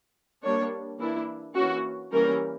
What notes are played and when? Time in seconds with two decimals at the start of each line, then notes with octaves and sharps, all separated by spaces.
0.43 G3 A#3 D4 C#5
0.99 E3 A#3 D4 E4
1.55 E3 A#3 C#4 F#4
2.12 E3 G3 A#3 C#4 A#4